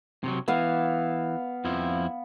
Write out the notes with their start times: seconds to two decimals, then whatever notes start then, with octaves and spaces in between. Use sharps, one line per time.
0.24 C3 D#3 F#3
0.48 E3 B3 F5
1.65 F2 F3 E4